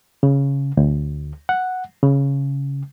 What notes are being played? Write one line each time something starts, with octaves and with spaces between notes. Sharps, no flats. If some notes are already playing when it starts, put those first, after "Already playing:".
C#3
D2
F#5
C#3